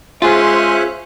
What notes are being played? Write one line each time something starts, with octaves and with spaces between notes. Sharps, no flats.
G#3 C#4 F4 G#4 C5 E5 C6 F#6